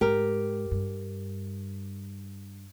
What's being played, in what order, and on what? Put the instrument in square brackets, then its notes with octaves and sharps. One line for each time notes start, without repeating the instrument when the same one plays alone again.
[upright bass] G#2 [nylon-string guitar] G4 A#4
[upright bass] G2